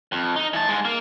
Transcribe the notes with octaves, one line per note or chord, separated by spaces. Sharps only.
F2
D#4
E3 A5
G#2 G#3
A#3